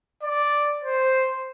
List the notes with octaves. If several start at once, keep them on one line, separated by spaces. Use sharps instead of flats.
D5
C5